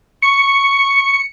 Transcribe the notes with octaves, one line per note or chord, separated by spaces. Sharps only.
C#6 C#7